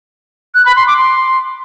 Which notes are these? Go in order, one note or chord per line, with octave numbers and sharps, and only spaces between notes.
F#6
B5
C6
D6
C6